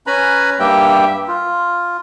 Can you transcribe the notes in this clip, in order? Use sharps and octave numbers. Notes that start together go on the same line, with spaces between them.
C#4 B4 G#5 A#5 B5
G2 G3 A#3 G4 E5 G5
F4